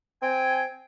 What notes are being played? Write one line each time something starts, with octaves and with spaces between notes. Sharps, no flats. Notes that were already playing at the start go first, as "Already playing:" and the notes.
C4 G5 G#5